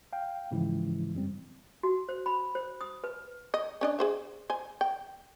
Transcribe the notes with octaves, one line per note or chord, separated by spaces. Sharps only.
F5 G5
G#2 C#3 E3 F3 G#3 E4
F#2 G3 C4
F#4
C5
B5
C5
D#6
B4
D#5
C#4 D4 D#5
G#4 C5 E5
C5 G#5
G5